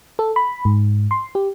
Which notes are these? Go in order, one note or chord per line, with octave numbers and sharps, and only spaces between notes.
A4
B5
G#2
C6
G4